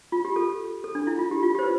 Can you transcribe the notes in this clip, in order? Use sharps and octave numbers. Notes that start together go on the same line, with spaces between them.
F4
G4
A4
A4
D4
E4
F4
G4
F4
G4
C5
B4